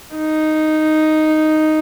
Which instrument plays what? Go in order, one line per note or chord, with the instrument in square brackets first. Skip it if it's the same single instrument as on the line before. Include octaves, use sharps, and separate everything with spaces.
[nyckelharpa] D#4